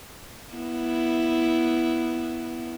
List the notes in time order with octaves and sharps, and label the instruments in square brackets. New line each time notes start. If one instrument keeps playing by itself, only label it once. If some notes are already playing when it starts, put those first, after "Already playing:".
[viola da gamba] B3 E4